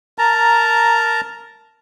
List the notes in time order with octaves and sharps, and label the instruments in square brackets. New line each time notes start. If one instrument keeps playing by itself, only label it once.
[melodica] A#4 A5 A#5